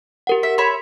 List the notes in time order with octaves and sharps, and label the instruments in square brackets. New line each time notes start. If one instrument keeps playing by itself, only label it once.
[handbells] G4 A#4 F#5
[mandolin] E5
[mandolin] C#5 E5 B5 [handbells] C6